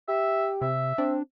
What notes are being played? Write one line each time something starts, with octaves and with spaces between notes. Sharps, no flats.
G4 E5
C3 E5
C4 D4